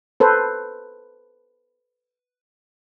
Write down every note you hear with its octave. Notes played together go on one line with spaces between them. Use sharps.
A4 B4 C5